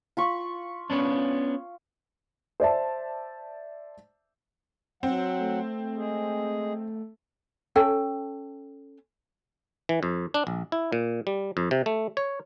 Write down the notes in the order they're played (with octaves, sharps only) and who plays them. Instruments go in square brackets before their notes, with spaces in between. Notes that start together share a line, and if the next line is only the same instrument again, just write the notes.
[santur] F4 B5 C#6
[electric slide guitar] B3 C#4 D4
[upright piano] C5 D5 E5 A5
[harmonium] F#3 F#5 [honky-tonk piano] C4
[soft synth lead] A3
[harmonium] G#3 G#4
[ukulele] C#4 A4 G5
[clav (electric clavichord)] E3
F2
D4
A#1
E4
A#2
G3
F2
C3
A3
C#5